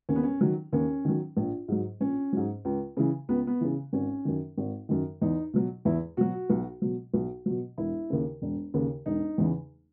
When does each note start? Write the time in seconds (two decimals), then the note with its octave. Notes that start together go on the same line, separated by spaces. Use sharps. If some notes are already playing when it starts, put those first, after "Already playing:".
0.09 D#2 C#4
0.16 B3
0.23 C#4
0.41 D#3 F#3
0.73 D#2 C#4
1.05 D#3 F#3
1.37 A#1
1.68 G#2 F#3
2.00 A#1 C#4
2.33 G#2 F#3
2.65 C#2
2.97 C#3 E3
3.29 C#2 B3
3.47 B3
3.61 C#3 E3
3.93 G#1 C#4
4.25 F#2 D#3
4.57 G#1
4.89 F#2 D#3
5.21 E2 D#4
5.53 B2 F#3
5.85 E2 E4
6.17 B2 F#3 F#4
6.50 B1
6.82 B2 F#3
7.14 B1
7.46 B2 F#3
7.78 E1 E4
8.10 D#2 C#3
8.42 E1
8.74 D#2 C#3
9.06 E1 D#4
9.38 E2 C#3 E3